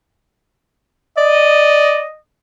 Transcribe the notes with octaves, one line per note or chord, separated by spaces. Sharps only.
D5 D#5